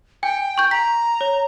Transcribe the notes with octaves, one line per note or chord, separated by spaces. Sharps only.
G5 G#5
C#6 G6
A#5 B6
C#5